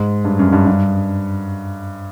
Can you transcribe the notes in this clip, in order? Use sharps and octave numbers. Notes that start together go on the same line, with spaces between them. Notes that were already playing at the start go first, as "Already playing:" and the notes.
Already playing: G#2
G2
F#2
G2
G2